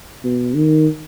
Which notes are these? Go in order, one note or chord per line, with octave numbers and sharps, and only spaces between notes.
B2
D#3